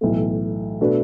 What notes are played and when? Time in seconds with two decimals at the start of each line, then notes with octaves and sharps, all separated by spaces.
0.01 B1 A2 E3 A3
0.81 B2 A3 D4 B4